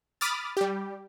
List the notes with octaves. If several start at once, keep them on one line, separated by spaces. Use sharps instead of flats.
B5 D6 D#6 F6 A6
G3 G4